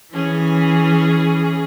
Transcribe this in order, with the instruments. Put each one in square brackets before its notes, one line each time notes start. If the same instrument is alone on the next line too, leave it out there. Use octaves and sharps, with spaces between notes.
[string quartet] E3 [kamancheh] C#4 [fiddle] G#4